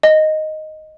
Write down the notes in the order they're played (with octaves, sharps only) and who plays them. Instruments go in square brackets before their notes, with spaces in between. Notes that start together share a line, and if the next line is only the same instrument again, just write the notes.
[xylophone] D#5